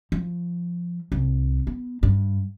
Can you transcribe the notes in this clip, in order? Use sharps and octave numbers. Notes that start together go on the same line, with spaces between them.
F3
C2
B3
G2